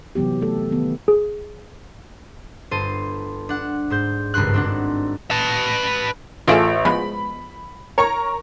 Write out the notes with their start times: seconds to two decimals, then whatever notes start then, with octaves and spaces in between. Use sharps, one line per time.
0.15 C3 E3 F#3 B3 G4
0.42 A3 A4
0.71 D#3 B3
1.08 G#4
2.71 G1 C5 A5 C6 D#7
3.49 D4 F#5
3.90 G#2 C5 G6
4.34 G#1 C#2 G2 C6 F#6
4.54 C4 D4 F#5
5.31 B4 A5
6.48 A1 F4 G#4 A4 E5 D7
6.85 F3 G#3 B3 B5
7.98 A#4 C#5 A#5 C#6